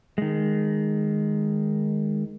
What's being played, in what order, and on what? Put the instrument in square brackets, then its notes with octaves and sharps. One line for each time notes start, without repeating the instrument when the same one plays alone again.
[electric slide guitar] D#3 G#3